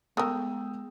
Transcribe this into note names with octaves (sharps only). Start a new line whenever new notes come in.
G#3 A3 B3 A#4 G5 D#6 E6